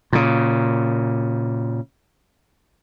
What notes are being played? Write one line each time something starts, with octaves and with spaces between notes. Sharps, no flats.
A#2 C#3